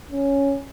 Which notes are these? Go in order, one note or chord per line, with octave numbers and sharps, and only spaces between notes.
C#4